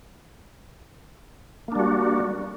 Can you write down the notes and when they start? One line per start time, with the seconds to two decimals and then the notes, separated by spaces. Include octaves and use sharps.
1.68 A#3
1.72 D4
1.75 G3
1.79 F#4